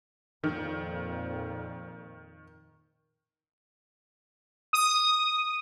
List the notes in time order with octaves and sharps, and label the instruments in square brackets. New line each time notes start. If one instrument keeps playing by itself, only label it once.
[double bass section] F2 A#2 [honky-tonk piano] D#3
[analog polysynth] D#6